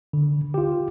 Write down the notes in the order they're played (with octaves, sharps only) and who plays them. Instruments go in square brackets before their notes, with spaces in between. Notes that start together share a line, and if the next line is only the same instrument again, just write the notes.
[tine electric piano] D3
F4 G4